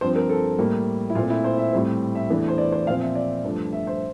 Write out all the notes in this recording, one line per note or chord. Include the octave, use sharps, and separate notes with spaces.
G2 F3 C4 C5
A#4
A4
A2 G3 A#3
E4
A#2 A3 C4 F4
E4
C5
E5
A2 G3 C4
E5
E2 E3 A3 D4
C5
D5
C5
A#2 F3 C4 F5
E5
D5
G2 F3 A3
E5
C5